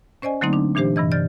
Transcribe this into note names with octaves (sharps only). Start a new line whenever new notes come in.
C#4 C5 D5 D#5 G#5
D3 F#3 A3 A#3 C4 D#4
D4
A#2 E3 D4 G4 C5
G2 C3 E3 D#5
D5 F6 G6 A6